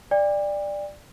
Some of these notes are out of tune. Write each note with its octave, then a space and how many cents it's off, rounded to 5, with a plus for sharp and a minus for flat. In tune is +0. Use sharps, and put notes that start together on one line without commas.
D5 +10 G5 +40